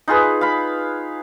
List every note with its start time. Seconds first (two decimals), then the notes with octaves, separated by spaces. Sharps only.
0.08 D#4 F4 G#4 B4
0.41 F5 B5